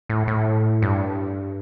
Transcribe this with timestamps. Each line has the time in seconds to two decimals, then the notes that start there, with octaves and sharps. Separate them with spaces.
0.09 A2
0.28 A2
0.82 G2